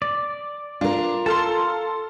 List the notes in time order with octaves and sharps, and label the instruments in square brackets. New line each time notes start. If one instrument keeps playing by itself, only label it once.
[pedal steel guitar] D5
[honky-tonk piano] D4 [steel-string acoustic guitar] F4 A#4
[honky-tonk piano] A4 C6 [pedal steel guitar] F5 A5